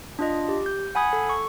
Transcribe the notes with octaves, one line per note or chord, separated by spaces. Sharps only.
D4 F4 D#5
G4
G6
F#5 G#5 B5 D#6 G#6
A4
C#6